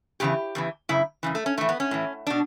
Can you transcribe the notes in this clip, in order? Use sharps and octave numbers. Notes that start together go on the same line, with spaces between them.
E2 C#3 E3 G4
E2 C#3 E3
F#2 C#3 E4
F#2 C#3 E3
A3
C#4
A2 E3 A3
B3
C#4
A2 E3
B2 D4